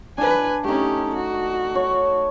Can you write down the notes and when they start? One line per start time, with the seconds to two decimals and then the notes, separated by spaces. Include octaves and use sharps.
0.18 D4 B4 G#5
0.64 A3 C#4 D#4 G4
1.16 F#4
1.75 C#5